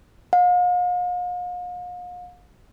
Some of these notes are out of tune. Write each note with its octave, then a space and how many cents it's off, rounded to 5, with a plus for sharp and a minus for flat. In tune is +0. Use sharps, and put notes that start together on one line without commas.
F5 +45